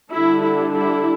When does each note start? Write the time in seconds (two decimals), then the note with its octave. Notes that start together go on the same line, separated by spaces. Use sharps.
0.13 D3 G3 D4 E4
0.44 E4
0.75 E4